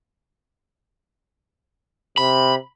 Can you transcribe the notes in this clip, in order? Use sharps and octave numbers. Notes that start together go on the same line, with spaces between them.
C3 B5